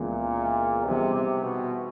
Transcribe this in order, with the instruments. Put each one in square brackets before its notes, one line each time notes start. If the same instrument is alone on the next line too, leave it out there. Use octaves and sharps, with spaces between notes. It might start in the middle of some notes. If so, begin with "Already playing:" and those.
Already playing: [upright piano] C#2 C#3 E3 G#3 B3 [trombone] A#2
[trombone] C3 [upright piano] E3 G3 B3 D#4 G#4
[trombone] C3
B2